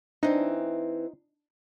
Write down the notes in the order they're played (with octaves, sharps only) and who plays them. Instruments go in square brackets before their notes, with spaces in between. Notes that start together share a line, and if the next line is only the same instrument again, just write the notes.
[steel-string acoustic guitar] E3 C4 [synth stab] D4 [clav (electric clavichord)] D#4